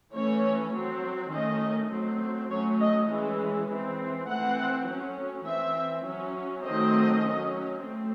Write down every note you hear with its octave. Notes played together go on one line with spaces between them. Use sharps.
E3 A3 C#4 C#5
F#3 C4
D#3 A3 C#4 D#5
F#3 A3 C4
F#3 A3 C#4 C#5
D#5
E3 G#3 C#4
E3 C4
E3 A3 C4 F#5
F#3 A3 C#4
E3 C4 E5
F#3 C#4
D#3 F#3 A3 C4 D#5
F#3 C#4
A3 C4